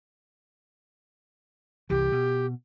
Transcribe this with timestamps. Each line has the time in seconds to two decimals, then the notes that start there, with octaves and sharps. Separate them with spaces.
1.90 C2 E3 G4
2.12 B2